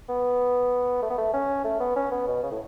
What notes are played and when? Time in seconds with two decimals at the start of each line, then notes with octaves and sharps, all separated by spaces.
0.09 B3
1.02 A3
1.10 B3
1.18 A3
1.33 C#4
1.65 A3
1.80 B3
1.96 C#4
2.12 B3
2.28 B2
2.43 C#3
2.51 A2